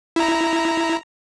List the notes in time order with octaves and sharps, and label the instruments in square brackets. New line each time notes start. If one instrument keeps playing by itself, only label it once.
[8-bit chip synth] E4 A#5